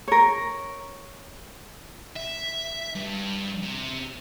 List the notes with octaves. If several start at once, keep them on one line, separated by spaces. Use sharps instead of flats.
A#4 C#5
E5
G2
C3